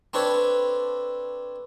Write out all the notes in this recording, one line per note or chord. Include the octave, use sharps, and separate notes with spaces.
C4 D4 A4 B4 C#5